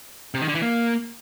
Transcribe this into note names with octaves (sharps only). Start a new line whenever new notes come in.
C3
D#3
D3
E3
A#3